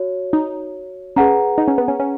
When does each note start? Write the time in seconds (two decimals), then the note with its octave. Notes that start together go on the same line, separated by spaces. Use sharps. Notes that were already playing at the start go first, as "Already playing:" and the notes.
Already playing: F#4 C#5
0.33 D#4
1.16 C#4 G#4 B4 F#5 A#5
1.58 D#4
1.68 C#4
1.78 B3
1.88 C#4
2.00 C#4